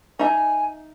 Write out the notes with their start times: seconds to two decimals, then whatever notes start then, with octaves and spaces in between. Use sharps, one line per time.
0.19 D#4 E5 G#5